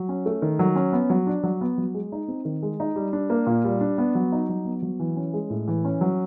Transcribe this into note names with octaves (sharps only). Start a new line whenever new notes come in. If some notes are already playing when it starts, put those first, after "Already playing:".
Already playing: F#3
C#4
A3
D#3
F#3
C#4
B3
F#3
D4
F#3
B3
F#3
G#3
D#4
C4
D#3
G#3
D#4
G3
D4
A#3
A#2
G3
D4
B3
F#3
D#4
F#3
B3
F#3
E3
C#4
G#3
A2
E3
C#4
F#3